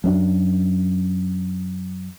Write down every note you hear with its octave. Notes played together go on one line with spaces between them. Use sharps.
F#2 B3 D4